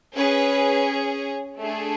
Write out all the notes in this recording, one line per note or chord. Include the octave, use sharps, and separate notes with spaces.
C#4 G#4 B4
A3 D4 G#4 A4